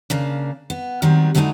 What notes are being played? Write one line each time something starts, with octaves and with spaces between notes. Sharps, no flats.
C#3 A#3 D4
B3
D#3 F#3 G3 B3 C4
D3 F#3 G#3 A3 D#4 E4